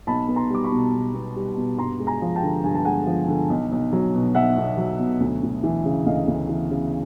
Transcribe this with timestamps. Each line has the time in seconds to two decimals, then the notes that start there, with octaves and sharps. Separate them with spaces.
0.07 B1 A5 B5
0.28 B3
0.36 A#5 C6
0.50 G3 D6
0.64 B5 C#6
0.72 B2
0.93 B1
1.14 B3
1.36 G3
1.57 B2
1.78 G2 A#5 C6
1.99 G#3
2.07 G#5 A#5
2.22 F3
2.36 G5 A5
2.43 D3
2.64 G2 G#5
2.75 A5
2.85 G#3 F#5 G#5
3.07 F3
3.28 D3
3.50 B1
3.72 B1
3.93 F#3
4.14 B2
4.35 B1 E5 F#5
4.57 B1
4.77 F#3
5.00 B2
5.20 D2
5.43 D2
5.63 E3
5.85 C#3
6.06 D2 D#5 F5
6.28 D2
6.49 E3
6.71 C#3